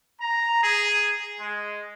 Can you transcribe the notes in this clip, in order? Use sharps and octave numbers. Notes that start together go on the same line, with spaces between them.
A#5
G#4
G#3